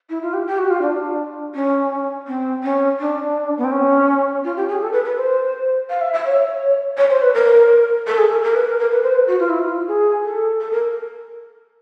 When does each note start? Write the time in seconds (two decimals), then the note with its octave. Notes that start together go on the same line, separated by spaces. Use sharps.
0.10 E4
0.22 F4
0.34 G4
0.47 G4
0.59 F#4
0.70 F4
0.82 D4
1.55 C#4
2.27 C4
2.64 C#4
3.00 D4
3.58 B3
3.64 C4
3.72 C#4
4.44 F4
4.57 G4
4.69 G#4
4.81 A4
4.93 B4
5.05 B4
5.17 C5
5.90 F5
6.01 E5
6.13 E5
6.26 C#5
6.98 C#5
7.10 C5
7.22 B4
7.34 A#4
8.07 A4
8.18 G#4
8.31 A#4
8.43 A#4
8.55 B4
8.67 A#4
8.79 A#4
8.91 B4
9.03 C5
9.15 B4
9.28 F#4
9.40 F4
9.49 E4
9.59 F4
9.88 G#4
10.24 A4
10.60 A4
10.72 A#4